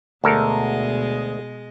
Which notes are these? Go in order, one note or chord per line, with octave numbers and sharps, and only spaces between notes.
D2 B2 G#3 A4 A#4 D#5